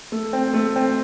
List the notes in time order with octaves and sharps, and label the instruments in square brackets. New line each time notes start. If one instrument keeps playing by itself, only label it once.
[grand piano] A3
C4
A3
C4